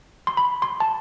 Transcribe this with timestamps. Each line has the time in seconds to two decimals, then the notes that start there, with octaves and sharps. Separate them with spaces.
0.27 C6
0.37 B5
0.62 C6
0.80 A5